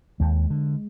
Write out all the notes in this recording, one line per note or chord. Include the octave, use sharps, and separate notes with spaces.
D#2 G#3
D3